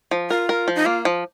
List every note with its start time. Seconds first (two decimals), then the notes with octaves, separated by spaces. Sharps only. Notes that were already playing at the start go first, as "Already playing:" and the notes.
0.11 F3
0.30 F4 A#4
0.49 A#4
0.68 F3
0.75 D#4
0.86 A#3 F4
1.05 F3